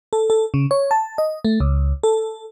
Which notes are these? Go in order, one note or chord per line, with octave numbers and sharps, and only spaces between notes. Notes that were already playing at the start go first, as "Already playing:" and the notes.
A4
A4
C#3
C#5
A5
D#5
A3
C#2
A4